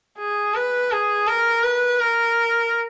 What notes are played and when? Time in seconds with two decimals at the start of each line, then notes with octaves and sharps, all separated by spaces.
0.18 G#4
0.55 B4
0.91 G#4
1.27 A#4
1.63 B4
2.00 A#4